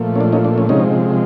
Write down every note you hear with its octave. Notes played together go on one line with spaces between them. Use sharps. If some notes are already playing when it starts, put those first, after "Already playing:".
Already playing: A#2 F3 A3
C#4
D4
C#4 D#4
D4
C#4
C3 F3 G#3 C#4 D#4